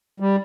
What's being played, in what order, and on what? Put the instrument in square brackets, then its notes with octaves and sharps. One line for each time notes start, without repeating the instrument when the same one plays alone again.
[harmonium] G3